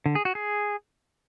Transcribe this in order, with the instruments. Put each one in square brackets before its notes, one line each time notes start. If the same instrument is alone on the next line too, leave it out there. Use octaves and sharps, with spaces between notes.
[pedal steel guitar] D3
G#4
F#4
G#4